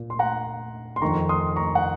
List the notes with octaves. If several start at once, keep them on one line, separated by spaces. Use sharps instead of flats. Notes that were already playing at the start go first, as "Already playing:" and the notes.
Already playing: A#2
C6
F#5 A#5
C6
F2 D#3 A#5 C#6
C6 D#6
A#5 C#6
F#5